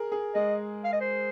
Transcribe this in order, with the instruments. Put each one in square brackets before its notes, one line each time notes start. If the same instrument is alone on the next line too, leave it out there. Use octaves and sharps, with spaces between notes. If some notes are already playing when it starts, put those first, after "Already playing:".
Already playing: [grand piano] G#4 A#4
G#4
[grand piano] G#3 [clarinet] D#5
[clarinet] F5
D#5
C5